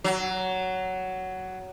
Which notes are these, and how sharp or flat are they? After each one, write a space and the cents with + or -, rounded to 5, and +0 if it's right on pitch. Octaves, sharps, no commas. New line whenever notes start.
F#3 +10